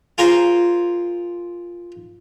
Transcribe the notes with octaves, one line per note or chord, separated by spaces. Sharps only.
F4 G#4 A#4 C5